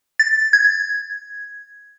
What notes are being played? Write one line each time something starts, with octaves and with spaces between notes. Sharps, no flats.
A6
G#6